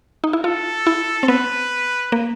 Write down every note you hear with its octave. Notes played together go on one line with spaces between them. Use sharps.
D#4
E4
F4 A4
E4
C4
B3 B4
A#3